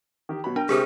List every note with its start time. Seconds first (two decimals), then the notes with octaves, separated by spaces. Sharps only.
0.29 D#3 G4
0.44 B2 F#3 B5
0.56 D4 A#4 G5
0.69 C3 G#3 G4 G#4 A#4 C5